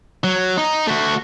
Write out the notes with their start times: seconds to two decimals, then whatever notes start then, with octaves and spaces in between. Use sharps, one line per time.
0.24 F#3
0.57 D#4
0.87 A3 F#4